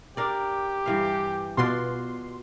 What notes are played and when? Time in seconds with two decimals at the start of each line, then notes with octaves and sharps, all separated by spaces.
0.17 D4 G4 A#4 D5
0.86 G2 E3 F5
1.57 B2 F4 F#4 D5 C6